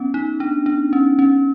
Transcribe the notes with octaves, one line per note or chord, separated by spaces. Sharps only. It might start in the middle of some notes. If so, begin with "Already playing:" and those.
Already playing: B3 C#4
D#4
D4
D4
C#4
C#4